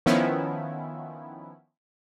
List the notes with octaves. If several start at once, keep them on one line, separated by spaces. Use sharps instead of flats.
D#3 F3 B3 C#4 E4